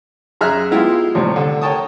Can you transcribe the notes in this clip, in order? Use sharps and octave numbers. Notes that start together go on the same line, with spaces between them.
F#2 G#4 E5 A#5 F6 F#6
G#3 B3 E4 F4 G4 F5
D#2 A2 C3 G3
D3 A4
A#4 C#5 G5 A5 C#6 D#6